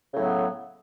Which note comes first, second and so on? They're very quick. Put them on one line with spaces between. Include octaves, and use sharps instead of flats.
C#3 A2 F#3 B3